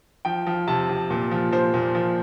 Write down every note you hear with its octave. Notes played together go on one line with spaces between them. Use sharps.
F3 G5
F3
C3 A5
C3
A#2
F3
F3 C5
A#2
F3